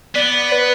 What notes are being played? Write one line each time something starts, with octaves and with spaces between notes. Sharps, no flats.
B3 D5
B4